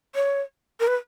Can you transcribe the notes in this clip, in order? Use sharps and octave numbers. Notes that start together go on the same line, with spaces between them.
C#5
A#4
B4